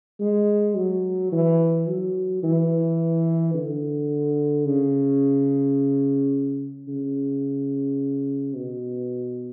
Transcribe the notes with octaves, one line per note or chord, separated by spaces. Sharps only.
G#3
F#3
E3
F#3
E3
D3
C#3
C#3
B2